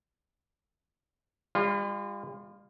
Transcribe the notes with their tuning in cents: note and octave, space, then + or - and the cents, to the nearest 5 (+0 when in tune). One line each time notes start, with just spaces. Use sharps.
G3 +45 F4 +0